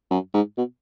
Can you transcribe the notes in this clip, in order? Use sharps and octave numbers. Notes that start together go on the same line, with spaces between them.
F#2
G#2
B2